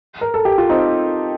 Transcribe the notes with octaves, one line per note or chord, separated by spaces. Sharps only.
A#4
A4
G4
F4
C4 D#4